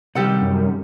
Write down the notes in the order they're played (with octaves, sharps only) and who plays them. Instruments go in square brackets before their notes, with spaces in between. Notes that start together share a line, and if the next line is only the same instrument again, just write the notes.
[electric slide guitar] C3 D#3 G3 [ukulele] G4 A4 F#5
[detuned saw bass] F#2